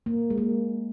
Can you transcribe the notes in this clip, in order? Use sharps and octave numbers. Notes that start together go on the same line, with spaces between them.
A#3
G#3
A#3